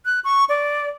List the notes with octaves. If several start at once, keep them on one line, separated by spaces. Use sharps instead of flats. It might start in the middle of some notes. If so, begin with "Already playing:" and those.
F#6
C#6
D5